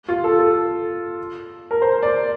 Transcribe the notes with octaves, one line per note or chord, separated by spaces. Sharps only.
F4
A4
A4
A#4
C5
D5